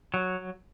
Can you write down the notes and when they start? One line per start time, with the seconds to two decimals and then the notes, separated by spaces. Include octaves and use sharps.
0.14 F#3